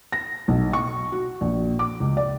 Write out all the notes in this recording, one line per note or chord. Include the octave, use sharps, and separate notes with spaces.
A#6
B1
C#6
F#4
A#1
D6
C#2
D5